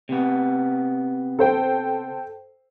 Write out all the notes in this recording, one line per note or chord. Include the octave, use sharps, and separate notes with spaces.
C3 B3
A4 C5 G5